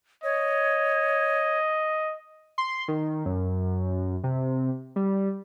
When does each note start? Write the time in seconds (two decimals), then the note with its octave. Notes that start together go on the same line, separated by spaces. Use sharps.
0.24 C#5 D#5
2.58 C6
2.88 D#3
3.26 F#2
4.24 C3
4.96 G3